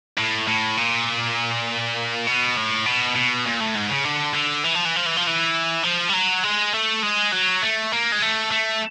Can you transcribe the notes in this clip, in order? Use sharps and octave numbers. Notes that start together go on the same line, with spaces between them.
A2
A2
A#2
B2
A2
B2
B2
A#2
A2
G#2
C#3
D3
D3
E3
F3
E3
F3
E3
F3
E3
F3
G3
F#3
G#3
A3
G#3
F#3
A3
A#3
G#3
A3
A3